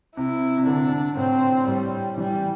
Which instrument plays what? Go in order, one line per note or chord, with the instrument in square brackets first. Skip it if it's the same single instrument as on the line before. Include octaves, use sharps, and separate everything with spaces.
[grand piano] C3 [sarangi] E4
[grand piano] C3
[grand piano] D3 [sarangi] D4
[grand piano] C3
[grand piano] A2 [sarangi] C4
[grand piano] A2 [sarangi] G3
[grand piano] E3 [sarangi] G3